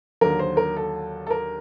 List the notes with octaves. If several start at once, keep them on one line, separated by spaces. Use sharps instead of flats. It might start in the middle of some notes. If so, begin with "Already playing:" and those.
D#2 D3 F#3 A#4
C5
A#4
A4
A4
A#4